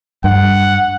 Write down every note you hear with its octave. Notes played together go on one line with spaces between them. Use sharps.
G2 F#5